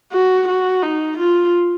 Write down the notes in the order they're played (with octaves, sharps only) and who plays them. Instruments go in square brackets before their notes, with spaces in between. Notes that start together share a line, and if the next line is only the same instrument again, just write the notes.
[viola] F#4
F#4
D#4
F4